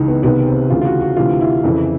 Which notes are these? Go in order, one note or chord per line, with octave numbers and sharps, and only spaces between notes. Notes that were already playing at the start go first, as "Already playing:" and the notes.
Already playing: C#2 E3 D#4
B3
C2 C3 D#3 B3
C4
D2 C#3 E3 F4
F4
F#4
F#4
D2 C3 E3 F4
E4
F2 C#3 E3